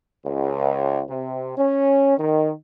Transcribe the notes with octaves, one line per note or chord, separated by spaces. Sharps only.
C#2
C3
C#4
D#3